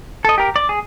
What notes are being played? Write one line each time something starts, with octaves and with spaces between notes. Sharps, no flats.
A4 D#5
G4 A#4
D5
G#4